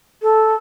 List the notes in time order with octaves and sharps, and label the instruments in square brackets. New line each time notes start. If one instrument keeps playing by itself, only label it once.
[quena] A4